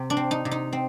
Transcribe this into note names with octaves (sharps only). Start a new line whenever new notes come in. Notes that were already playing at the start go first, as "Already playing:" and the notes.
Already playing: C3
D4
C4
D#4
C3
D#4
C4